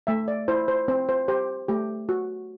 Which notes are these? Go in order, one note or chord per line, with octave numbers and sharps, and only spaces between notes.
A3 E5
D5
E4 C5
C5
C4 C5
C5
G4 C5
A3 G4
F#4